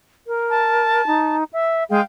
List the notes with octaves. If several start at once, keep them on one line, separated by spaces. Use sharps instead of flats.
A#4
A5
D#4
E5
G#3 G#4 F5 G5